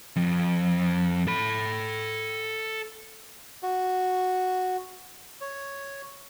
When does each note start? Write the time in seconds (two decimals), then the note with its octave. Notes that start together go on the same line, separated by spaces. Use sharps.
0.16 F2
1.27 A4 B5
3.63 F#4
5.41 C#5